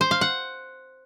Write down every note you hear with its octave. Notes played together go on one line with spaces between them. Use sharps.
C5
F5
F#5